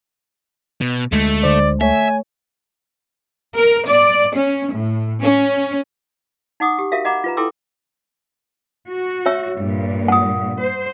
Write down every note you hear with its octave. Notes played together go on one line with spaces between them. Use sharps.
B2
D2 G#3 A3
D3 C5 D5
A3 C#5 E5 G#5
A#4
D5
C#4
A2
C#4
D#4 F#5 D6 D#6
G4
F#4 A#4 E5 F5
D#5 F#5 A#5 B5 D6
F4 B4 A#5
E4 A4 G5 C6 D6 E6
F#4
C#5 E5 E6
G2 A#2
F#5 D#6
C5